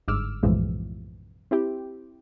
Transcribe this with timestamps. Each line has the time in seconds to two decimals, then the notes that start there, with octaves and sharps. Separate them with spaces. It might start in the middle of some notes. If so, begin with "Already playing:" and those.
0.08 G1 G#2 D6 E6 F6
0.43 B1 F#2 A2 E3 F3 G#3
1.51 C4 E4 G4